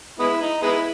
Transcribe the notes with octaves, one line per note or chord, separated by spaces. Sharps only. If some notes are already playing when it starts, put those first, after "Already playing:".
G#3 B3 E4
D#4
G#3 B3 E4